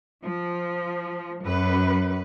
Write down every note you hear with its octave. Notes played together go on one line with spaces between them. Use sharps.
F3
F#2 B4